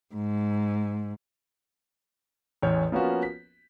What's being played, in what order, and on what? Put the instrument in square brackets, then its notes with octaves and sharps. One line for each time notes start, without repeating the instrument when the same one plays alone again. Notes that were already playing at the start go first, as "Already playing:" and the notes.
[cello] G#2
[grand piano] A1 E2 C#5 F6 G6
F3 A#3 B3 C#4 F4 F#4
B6